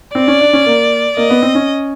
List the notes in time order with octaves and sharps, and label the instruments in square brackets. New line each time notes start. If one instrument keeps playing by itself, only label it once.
[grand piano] C4 [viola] D5
[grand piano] C#4
D4
C#4
A#3
[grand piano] A#3 [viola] D#5
[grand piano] B3
C4
C#4